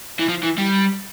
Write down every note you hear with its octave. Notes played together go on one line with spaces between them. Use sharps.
E3
F3
E3
G3